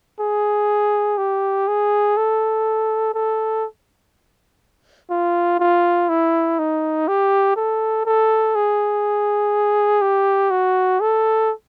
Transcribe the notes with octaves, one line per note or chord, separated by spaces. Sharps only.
G#4
G4
G#4
A4
A4
F4
F4
E4
D#4
G4
A4
A4
G#4
G4
F#4
A4